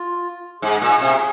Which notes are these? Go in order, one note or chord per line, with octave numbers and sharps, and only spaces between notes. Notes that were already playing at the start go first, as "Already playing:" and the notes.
Already playing: F4
G#2 G#4
A#2
C3